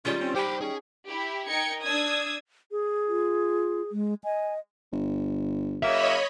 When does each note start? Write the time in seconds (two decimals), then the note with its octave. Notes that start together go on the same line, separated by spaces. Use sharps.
0.05 D#3 G3 G#3 C#4 F4
0.19 C4 C#4
0.35 G4 C5 G5 B5
0.61 C#4 D#4 G#4
1.07 E4 G4
1.48 D#4 A#4 G5 G#6 C#7
1.82 D4 D#6 E6 G#6
2.71 G#4
3.08 F4
3.92 G#3
4.24 D#5 G#5
4.92 G1
5.83 C#3 F#3 A#3 C#5 D#5 E5 B5